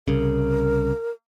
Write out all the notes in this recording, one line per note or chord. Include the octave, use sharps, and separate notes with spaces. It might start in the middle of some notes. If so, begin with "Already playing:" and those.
C2 C#3 A#4